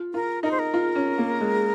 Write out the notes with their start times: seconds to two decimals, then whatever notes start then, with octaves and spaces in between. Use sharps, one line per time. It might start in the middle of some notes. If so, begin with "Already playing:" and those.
Already playing: F4
0.14 F4 A#4
0.43 D#4 A#4
0.51 C5
0.59 A#4
0.74 F4
0.95 C#4
1.18 A#3
1.41 G#3